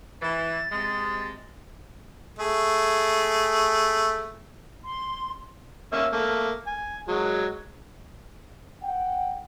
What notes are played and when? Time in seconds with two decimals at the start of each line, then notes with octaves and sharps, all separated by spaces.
0.22 E3 A6
0.72 C3 G#3
2.39 A3 G#4
4.84 C6
5.93 A#3 C#4 E5
6.13 A3 A#3
6.66 G#5
7.08 F#3 G#3
8.82 F#5 G5